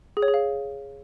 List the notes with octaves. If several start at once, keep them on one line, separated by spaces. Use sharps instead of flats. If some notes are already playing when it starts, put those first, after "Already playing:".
G#4
C#5
G#4
F5